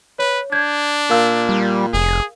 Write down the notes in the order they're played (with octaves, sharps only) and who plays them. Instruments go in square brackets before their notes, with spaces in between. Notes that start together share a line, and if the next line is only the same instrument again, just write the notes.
[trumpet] B4 [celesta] C#5
[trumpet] D4 [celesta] G6 G#6
[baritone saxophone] A#2 [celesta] A#4 F5 E6
[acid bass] G3
[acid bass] F1 [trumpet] G#4